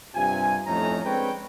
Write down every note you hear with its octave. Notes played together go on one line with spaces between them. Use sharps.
G2 C3 F4 G#5
F2 A2 A3 C#4 D#4 A#5
G#3 C4 D4 B4 C#5 G5